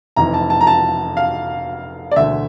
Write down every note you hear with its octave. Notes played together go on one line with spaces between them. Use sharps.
F1 F2 E3 A#5
A5
A5
A#5
A5
F5
D5
E1 D2 D3 A3 E5